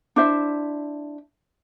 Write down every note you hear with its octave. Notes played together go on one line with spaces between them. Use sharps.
D4 E4 C5 E5